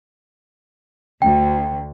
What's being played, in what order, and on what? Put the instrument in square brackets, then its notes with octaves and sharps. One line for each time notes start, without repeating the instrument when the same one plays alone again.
[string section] D2 [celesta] G5